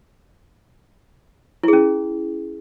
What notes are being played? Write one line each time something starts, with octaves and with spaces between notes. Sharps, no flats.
C#4 E4 G#4